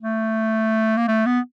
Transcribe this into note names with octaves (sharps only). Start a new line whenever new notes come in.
A3
A#3
A3
B3